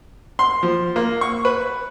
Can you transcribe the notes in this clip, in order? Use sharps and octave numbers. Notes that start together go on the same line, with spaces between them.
C6
F3
A#3
C#6
B4